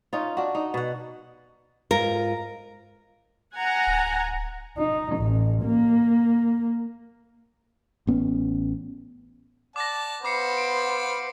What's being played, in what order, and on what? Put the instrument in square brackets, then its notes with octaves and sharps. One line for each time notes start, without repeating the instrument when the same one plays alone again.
[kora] C#4 D#4 F4
D4 F#4
D#4
B2 F#5
[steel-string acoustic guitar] G#2 F4 A#5 [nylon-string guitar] A#4
[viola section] F#5 G#5 A#5
[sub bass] D1
[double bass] D#4
A1
A#3
[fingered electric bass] A1 B3 C#4
[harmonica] D5 F#5 A5 [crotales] D6 A#6
[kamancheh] B3 C5 [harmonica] F5 B5 [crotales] D6 C7 C#7
[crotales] D7